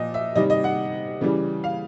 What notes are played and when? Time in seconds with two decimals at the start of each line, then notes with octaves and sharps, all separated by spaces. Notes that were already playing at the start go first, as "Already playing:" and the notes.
Already playing: A#2 F3 D#5
0.14 E5
0.35 C3 D#3 G3 D#5
0.50 D#5
0.64 F#5
1.21 C#3 E3 G3
1.64 F5